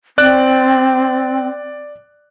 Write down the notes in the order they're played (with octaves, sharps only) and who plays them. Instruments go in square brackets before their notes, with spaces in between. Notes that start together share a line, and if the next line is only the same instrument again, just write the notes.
[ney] C4 [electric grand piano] D5 F#6